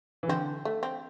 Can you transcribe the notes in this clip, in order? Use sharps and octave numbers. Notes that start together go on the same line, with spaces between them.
E3
D3 C4
A3
C4